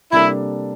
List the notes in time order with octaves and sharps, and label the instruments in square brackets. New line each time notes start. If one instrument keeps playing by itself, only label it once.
[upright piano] C3 G3 A#3 D4 A4 [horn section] E4